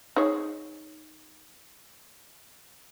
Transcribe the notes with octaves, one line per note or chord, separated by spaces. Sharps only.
D#4 G#4 C#5